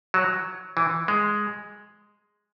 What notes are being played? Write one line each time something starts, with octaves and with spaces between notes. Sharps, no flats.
F#3
E3
G#3